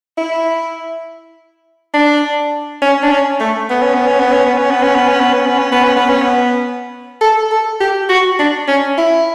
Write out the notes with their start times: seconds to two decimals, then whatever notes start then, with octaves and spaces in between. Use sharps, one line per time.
0.18 E4
1.94 D4
2.82 C#4
3.03 D4
3.12 C#4
3.40 A3
3.70 B3
3.83 C#4
3.95 B3
4.08 C#4
4.20 B3
4.33 C#4
4.46 B3
4.58 C#4
4.71 B3
4.84 C#4
4.96 B3
5.09 C#4
5.21 B3
5.34 C#4
5.47 B3
5.59 C#4
5.72 B3
5.85 C#4
5.96 B3
6.10 C#4
6.22 B3
7.21 A4
7.51 A4
7.81 G4
8.09 F#4
8.39 D4
8.68 C#4
8.98 E4